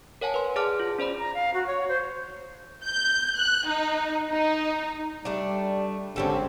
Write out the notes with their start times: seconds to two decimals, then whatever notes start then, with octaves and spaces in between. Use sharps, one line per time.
0.21 A#4 C#5 F#5 G#5 A5
0.34 B4 C6
0.56 G#4 D5 F#5 A5 D6 F6
0.80 F4
0.99 C#4 C5 D5 B5
1.19 A#5
1.34 F5
1.54 F#4
1.67 C#5
1.89 C5
2.84 G6
3.39 F#6
3.68 D#4
4.32 D#4
5.25 G3 A3 D4
6.16 G#1 D3 C4 C#4 G4 A4